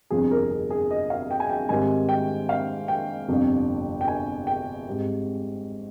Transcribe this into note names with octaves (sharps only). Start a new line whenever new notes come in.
G1 F2 C3 F3 G#4
A#4
G#4
G#4
D#5
F5
G5
G#5
G5
G#2 D#3 G3 C4 G#5
G5
F5
G5
G1 F2 C3
G5
G#5
G5
G#2 G3 C4